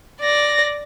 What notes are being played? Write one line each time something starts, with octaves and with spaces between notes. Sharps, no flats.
D5 A#6